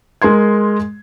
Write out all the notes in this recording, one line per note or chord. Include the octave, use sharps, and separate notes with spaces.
G#3 A#4 C6 G#6